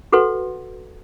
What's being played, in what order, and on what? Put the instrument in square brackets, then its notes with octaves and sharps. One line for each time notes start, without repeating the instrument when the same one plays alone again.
[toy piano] F#4 A4 B4 F#5 C6